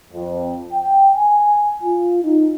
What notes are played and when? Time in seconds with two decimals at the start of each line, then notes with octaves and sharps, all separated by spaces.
0.13 F2
0.73 G5
1.15 G#5
1.83 F4
2.23 D#4